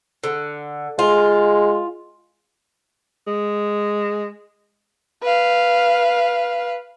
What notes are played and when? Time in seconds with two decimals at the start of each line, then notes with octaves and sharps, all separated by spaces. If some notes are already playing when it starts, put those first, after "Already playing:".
0.24 D3
0.99 G#3 F4
3.27 G#3
5.22 B4 F5